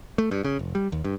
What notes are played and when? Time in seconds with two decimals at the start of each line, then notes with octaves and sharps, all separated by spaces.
0.18 A3
0.31 G2
0.44 C#3
0.59 F1
0.75 G3
0.92 D#2
1.04 G2